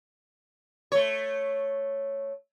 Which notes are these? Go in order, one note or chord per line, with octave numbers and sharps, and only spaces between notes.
A3 C#5